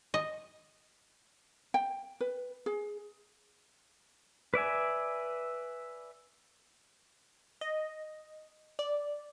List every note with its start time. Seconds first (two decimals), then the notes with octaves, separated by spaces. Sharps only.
0.14 D#5
1.74 G5
2.21 B4
2.66 G#4
4.54 B4 D5 E5 G#5
7.61 D#5
8.79 D5